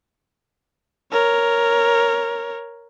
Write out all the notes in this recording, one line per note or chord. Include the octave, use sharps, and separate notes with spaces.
A#4 C#5